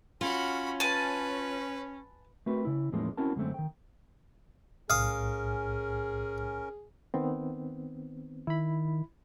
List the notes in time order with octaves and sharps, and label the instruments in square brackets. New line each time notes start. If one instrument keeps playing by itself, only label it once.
[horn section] C#4 [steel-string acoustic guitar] F4 [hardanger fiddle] F#4 B5
[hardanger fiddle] B4 [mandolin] G#5 A5
[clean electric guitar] A3 C4 F#4 A#4 B4
C#3 E4
E2 A2 F3 G#3 A#3 C#4
C4 C#4 E4 F#4 A#4 A5
F#2 D3 G#3 A3 C4
D#3 G5
[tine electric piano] B1 A2 [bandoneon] C#4 A#4 [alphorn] G#4 [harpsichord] F5 D#6
[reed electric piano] D#3 B3 C4
[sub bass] D#3 [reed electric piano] E4 B5